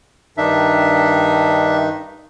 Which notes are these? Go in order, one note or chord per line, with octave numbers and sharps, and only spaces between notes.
G2 D#3 D4 D#4 E5